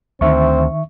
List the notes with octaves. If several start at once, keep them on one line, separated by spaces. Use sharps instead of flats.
D2 D#3 C4 E5 C#6